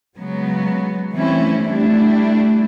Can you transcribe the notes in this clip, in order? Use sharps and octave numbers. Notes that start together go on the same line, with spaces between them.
C#3 F#3 G#3 B3
E3 G3 A3 C4 C#4 E4
G3 A3 D4 E4